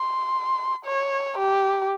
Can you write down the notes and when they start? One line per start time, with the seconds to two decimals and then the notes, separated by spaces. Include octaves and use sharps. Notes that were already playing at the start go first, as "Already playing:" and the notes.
Already playing: C6
0.86 C#5
1.38 G4